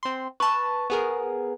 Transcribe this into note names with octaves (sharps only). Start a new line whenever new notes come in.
C4 C6
B4 A5 C#6
B3 G#4 A#4